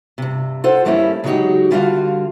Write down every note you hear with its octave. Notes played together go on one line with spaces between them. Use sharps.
G2 C3
F4 A4 C5 F#5
G2 G3 A3 A#3 C#4 E4
C#3 F#3 G#3 D#4 F#4 G4
D3 G3 F4 F#4 F5